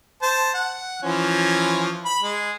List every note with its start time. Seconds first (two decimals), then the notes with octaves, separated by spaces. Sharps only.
0.22 C5 A5
0.54 F#5
1.02 E3 F3 C#4
2.05 B5
2.23 G#3